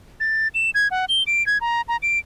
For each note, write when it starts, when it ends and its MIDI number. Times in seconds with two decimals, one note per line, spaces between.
0.20 0.48 93
0.55 0.70 100
0.75 0.88 92
0.91 1.05 78
1.09 1.23 103
1.27 1.45 98
1.46 1.58 92
1.61 1.82 82
1.88 1.97 82
2.03 2.19 98